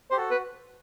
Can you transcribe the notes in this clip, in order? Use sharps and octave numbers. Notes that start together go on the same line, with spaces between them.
G4 C5
F#4 A4
B4